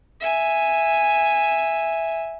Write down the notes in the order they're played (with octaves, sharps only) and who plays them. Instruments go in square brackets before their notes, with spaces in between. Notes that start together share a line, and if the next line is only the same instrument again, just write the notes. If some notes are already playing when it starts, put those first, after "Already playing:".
[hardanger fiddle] E5 G#5